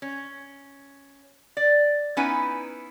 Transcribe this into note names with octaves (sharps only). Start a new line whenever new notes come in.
C#4
D5
B3 C#4 D#4 E4 B4 G#5